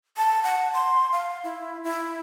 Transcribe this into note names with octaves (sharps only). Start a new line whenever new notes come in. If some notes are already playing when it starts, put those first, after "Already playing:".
A5
F#5
C6
F5
E4
E4